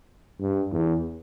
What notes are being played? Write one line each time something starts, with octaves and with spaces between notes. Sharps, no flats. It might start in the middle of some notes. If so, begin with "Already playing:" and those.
G2
E2